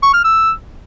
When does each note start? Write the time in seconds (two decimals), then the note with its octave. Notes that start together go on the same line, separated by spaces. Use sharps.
0.03 C#6
0.13 F6
0.24 E6